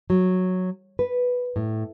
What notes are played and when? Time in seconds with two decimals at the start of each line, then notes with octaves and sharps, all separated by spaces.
0.10 F#3
0.99 B4
1.56 A2